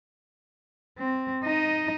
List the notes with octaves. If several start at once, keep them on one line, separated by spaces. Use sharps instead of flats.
C4
D#4 D#5